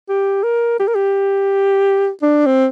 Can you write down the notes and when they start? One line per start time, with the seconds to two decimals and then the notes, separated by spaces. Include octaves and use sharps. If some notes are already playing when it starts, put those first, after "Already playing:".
0.09 G4
0.43 A#4
0.79 G4
0.87 A#4
0.95 G4
2.22 D4
2.46 C4